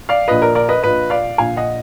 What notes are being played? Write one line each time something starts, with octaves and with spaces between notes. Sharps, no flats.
D5 F5
A#1 A#2 B4 D#5
A#4 D5
A#4 D5
B4 D#5
A#1 A#2 B4 D#5
D5 F5
A#1 A#2 F5 G#5
D#5 F#5